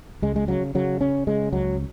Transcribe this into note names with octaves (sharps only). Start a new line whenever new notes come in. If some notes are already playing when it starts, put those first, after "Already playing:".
C#2 G#3
G#3
C#3 F#3
C#3 F#3
C#3 C#4
C#3 G#3
C#2 F#3